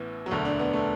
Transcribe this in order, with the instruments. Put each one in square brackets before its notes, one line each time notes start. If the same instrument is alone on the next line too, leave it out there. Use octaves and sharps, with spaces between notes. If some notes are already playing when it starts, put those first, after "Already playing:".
Already playing: [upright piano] A1 A2 E3 B3
F#3
E1 D2 D3 A3
D4
B3
A3